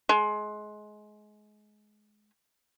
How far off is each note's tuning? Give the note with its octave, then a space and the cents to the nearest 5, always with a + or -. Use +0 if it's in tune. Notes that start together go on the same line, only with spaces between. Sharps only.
G#3 +25